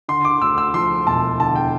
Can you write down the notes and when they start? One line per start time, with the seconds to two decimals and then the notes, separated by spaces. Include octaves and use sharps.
0.08 D3 C6
0.25 D6
0.41 D2 E6
0.58 E6
0.74 F3 C6
1.07 E1 A5
1.40 D3 A5
1.55 G5